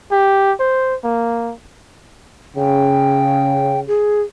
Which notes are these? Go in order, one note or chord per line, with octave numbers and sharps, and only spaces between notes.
G4
C5
A#3
C#3 G5
G#4